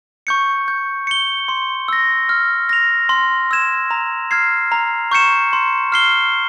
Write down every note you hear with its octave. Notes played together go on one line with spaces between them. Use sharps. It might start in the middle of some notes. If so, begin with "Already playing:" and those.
C#6 G6 C#7
G6
C#7 G7
C6
E6 A#6
F6
A#6 F7
C6
E6 G#6 E7
A#5
F6 G#6 C7
A#5
C#6 G6 C#7 E7
C6
F6 C7 G7